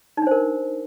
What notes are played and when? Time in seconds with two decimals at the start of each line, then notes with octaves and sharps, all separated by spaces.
0.17 D#4
0.22 D4
0.27 C5
0.31 A#4